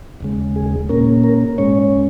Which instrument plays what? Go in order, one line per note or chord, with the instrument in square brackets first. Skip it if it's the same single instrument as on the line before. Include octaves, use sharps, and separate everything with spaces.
[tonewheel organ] D#2 C#3 G#3
G#4
A#2 A#3 C#4 A#4
A#4
G#2 G#3 C#4 C#5